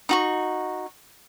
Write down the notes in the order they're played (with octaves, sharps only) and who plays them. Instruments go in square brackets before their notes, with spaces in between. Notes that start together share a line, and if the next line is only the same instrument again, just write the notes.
[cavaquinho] D#4 F#4 C#6